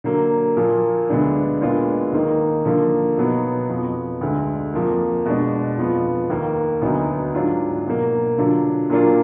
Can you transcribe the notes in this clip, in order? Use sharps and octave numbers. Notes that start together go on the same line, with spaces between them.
D3 F#3 A#3
A#2 F3 A#3
D2 D3 G#3 B3 D4
A#2 G#3 B3 D4 F4
D#2 D#3 A#3 D#4
D3 F3 A#3
B2 F#3 B3 D#4
F2 F3 B3
D2 D3 G#3
F2 F3 A#3
B2 G#3 D4
F2 F3 B3 F4
D#2 D#3 A#3
D2 D3 F#3 B3 D#4
G#2 F#3 D4 F4
B2 F#3 A#3
D3 F#3 D4 F4
A#2 F#3 A#3 D4 F4